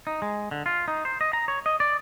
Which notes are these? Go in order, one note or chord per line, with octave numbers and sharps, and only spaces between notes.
D#4
G#3
D3
F4
D#4
C5
D#5
A#5
C#5
D#5
D5